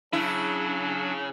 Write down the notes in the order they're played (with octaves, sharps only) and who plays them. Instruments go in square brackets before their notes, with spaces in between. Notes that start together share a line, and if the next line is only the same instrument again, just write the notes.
[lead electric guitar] C#3 [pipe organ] F#3 D4 [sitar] E4